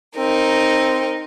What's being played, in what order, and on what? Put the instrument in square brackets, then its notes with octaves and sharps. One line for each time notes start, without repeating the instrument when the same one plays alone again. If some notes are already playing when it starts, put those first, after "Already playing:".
[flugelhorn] C4 [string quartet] D#4 A#4